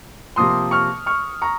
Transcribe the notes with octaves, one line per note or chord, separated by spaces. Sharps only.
C3 F3 A#3 C6 D#6
C#6 F6
C#6 F6
A#5 C#6